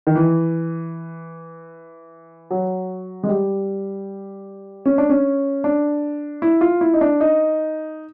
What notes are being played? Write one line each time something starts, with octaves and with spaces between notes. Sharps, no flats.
D#3
E3
F#3
G#3
G3
C#4
D4
C#4
D4
E4
F4
E4
D#4
D4
D#4